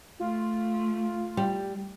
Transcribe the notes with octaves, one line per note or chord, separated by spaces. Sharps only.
A3 F4
G3